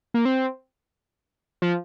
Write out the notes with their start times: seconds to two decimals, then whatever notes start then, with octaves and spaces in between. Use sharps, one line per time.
0.14 A#3
0.25 C4
1.62 F3